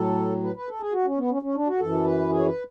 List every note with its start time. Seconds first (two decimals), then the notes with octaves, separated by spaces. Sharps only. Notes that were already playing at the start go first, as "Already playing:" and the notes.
Already playing: A2 F#3 A4
0.43 B4
0.56 B4
0.68 A4
0.80 G#4
0.93 F#4
1.06 C#4
1.17 B3
1.31 C#4
1.42 C#4
1.55 D4
1.67 F#4
1.80 F#2 E3 A4
2.05 B4
2.29 G#4
2.39 C#5
2.46 B4